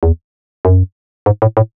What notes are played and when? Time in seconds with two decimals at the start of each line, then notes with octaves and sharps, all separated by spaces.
0.03 E2
0.65 F#2
1.26 G#2
1.42 A2
1.57 A2